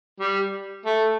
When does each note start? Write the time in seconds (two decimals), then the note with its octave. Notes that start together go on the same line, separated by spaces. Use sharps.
0.20 G3
0.86 A3